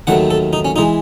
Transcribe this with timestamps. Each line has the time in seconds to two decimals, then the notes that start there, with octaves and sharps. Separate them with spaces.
0.07 D#2 D#3 F#3 A3 F#5
0.31 A4
0.53 D#4
0.65 C#4
0.76 E3 G#3 D#4